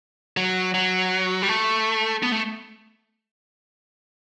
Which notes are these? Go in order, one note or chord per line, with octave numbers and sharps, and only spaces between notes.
F#3
F#3
G3
A3
B3
A3